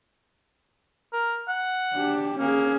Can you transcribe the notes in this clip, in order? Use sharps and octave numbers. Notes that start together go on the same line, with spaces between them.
A#4
F#5
D4 G4
A#3 C#4 G#4